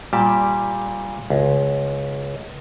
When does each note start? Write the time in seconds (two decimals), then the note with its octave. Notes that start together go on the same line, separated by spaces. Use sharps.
0.13 A#2 G3 G4 A5
1.30 C#2